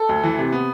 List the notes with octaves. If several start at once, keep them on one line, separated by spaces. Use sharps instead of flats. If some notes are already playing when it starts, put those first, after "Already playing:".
Already playing: A4
D2
E3
C3
B3